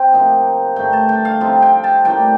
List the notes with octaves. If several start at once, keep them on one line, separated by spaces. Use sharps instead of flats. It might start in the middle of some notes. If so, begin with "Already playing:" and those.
Already playing: C4 G5
C3 F3 A#3 D#4
G2 D3 A3 D#4 G5
A5
G5
F5
C3 F3 C4 D#4
G5
A5
A2 G3 A#3 D4 G5